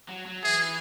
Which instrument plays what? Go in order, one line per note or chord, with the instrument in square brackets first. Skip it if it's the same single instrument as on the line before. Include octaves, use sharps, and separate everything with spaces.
[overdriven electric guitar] F#3
F#3
[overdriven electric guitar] E3 [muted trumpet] G#4